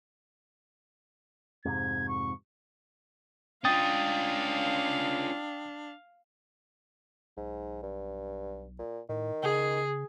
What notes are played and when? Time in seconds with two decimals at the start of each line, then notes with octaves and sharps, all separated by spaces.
1.65 F2 G#2 C3 G#6
2.09 C#6
3.65 C#4 D4 F4 F5 G5 D#6 A6
7.37 B1 G#2
7.83 G2
8.79 A#2
9.09 A2 D#3
9.43 C#3 G#4